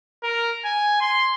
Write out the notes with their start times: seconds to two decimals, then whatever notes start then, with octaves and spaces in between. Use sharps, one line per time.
0.23 A#4
0.65 G#5
1.01 C6